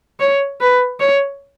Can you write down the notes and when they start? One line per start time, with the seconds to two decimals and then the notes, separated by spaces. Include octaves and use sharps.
0.20 C#5
0.61 B4
1.00 C#5